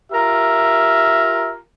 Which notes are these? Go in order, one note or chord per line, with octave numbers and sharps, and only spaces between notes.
F4 G4 A#4 E5